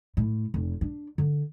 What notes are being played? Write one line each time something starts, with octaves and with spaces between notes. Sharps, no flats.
A2
F1
D4
D3